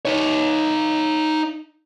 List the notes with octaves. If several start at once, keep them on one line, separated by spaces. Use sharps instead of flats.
D#4 C#5